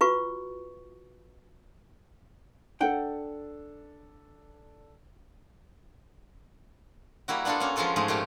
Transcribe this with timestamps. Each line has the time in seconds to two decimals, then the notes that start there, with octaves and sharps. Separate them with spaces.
0.01 F4 F#4 B4 C#6
2.81 D4 A4 F#5 G5
7.28 G3 A#3 E4 F#4
7.45 B3 D4 F4 F#4 A4
7.60 A#3 C#4
7.76 F3 G#3 C#4 F4 A4 B4
7.96 G#2 F3 A3 G#4
8.08 A#2 F3 A3 F4 G4